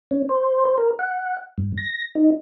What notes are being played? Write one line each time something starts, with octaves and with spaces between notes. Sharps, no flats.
C#4
C5
C5
A#4
F#5
G2
A#6
D#4